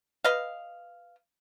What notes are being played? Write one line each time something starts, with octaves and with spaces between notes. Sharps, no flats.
B4 D#5 F5